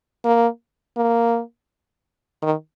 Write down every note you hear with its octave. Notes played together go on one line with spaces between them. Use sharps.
A#3
A#3
D#3